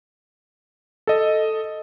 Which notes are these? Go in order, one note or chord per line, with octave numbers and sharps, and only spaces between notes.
A4 D#5